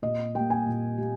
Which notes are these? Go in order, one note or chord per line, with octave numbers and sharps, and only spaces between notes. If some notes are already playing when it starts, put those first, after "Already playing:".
A#2 D#5
G3 A#3 G5
G#5
A#2
G3 A#3